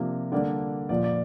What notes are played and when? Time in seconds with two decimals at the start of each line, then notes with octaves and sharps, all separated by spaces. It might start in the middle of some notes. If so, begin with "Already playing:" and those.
Already playing: C3 F3 A#3 D4
0.32 D3 G3 A#3 D4 D5
0.89 A#2 F3 A#3 D5
1.04 D5